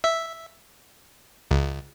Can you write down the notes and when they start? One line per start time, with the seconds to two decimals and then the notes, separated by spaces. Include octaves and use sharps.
0.04 E5
1.51 C#2